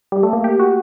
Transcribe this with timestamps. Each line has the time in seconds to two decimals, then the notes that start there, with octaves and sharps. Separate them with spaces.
0.12 G3
0.23 A3
0.33 A#3
0.44 G4
0.60 F#4